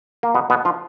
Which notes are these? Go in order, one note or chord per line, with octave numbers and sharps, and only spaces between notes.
A#3
B2 B3
B2 B3
F3 F4